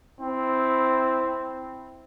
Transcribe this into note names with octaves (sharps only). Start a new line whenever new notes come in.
C4 E4